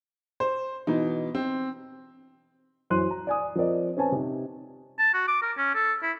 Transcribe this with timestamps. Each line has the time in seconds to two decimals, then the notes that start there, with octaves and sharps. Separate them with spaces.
0.40 C5
0.87 B2 E3 D#4
1.35 C4
2.90 F#2 E3 C5 C6 F#6 D#7
3.11 A#5
3.27 D5 G#5 D#6
3.55 F3 C4 A#4 D5 D#5
3.97 C4 C#4 B4 G#5 A5
4.12 C3 D#4
4.99 A5
5.14 F#4
5.28 D6
5.42 A#4
5.58 C#4
5.74 A4
6.02 E4